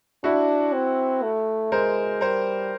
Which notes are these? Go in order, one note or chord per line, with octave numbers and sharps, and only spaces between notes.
D4 E4 F#4
C4
A3
G#3 A#4 C5
G3 A#4 C5